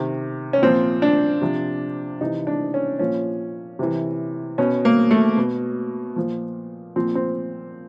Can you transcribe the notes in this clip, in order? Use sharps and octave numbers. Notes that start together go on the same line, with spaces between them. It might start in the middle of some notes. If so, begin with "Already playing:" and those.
Already playing: C3 D#3
C#4
A#2 F3 C4
D4
C3 F3
C3 E3 D#4
D4
C#4
A#2 F3 C#4
C3 E3
B2 C#4
A#3
A3
B2
A#2 F3
A#2 F3 C4
C4